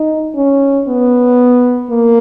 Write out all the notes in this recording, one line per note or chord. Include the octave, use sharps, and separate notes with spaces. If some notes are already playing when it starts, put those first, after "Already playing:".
Already playing: D#4
C#4
B3
A#3